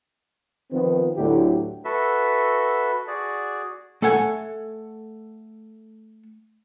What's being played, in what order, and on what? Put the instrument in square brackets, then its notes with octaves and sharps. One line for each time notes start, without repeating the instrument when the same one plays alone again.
[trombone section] D#3 F3 B3 C4
D2 A2 D3 F#3 E4 G4
[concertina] F#4 A4 B4 E5
F#4 G#4 D5
[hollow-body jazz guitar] A3 A4 F#5 G#5